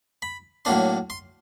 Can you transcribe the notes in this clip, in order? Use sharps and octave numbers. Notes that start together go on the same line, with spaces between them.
B5
A2 F#3 A#3 D4 C6
C6